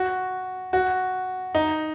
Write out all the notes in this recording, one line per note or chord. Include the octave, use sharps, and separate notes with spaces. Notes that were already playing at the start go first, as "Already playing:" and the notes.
Already playing: F#4
F#4
D#4